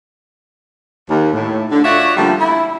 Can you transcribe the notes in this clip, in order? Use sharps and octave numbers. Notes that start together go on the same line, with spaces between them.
D#2
A2
D3
F4 F#4 C#5 D5 E5 F#5
D3 F3 G3 A3 A#3 C#4
E4